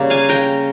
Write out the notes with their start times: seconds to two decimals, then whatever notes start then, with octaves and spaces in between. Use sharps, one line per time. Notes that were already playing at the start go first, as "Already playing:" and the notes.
Already playing: C#3 G3 A#3
0.10 F5 G#5
0.29 G5 A#5